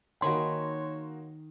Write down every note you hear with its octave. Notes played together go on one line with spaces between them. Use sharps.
D#3 A#3 D#4 F#4 C#5 G#5 B5 C6